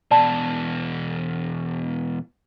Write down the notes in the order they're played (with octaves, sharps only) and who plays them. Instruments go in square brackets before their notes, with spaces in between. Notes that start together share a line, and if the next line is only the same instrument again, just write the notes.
[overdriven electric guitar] E2 B2 [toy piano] D5 A5 B5